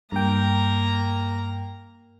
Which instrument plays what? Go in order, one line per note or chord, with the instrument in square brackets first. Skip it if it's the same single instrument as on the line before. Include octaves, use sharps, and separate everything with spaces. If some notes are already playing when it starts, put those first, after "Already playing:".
[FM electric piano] G2 G5 [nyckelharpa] A#3 A#5